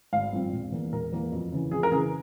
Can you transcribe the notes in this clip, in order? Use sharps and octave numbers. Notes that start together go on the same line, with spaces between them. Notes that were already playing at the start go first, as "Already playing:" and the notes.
G#1 F5
G2 F3 C4
E1
E2 E3 A#3
E1 A#4
E2 E3 A#3
F2
C#3 E3
F2 G#4
A#4
C#3 E3 G#4